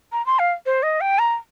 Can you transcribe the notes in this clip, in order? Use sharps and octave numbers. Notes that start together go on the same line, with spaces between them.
A#5
C6
F5
C5
D#5
G5
A#5